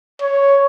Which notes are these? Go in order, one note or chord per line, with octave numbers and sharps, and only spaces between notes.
C#5